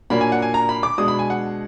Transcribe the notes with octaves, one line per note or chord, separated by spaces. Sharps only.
A#2 F#3 A#3 D4 B5
G#5
F#5
G#5
A#5
B5
D6
B2 G#3 D4 D#6
B5
G#5
F#5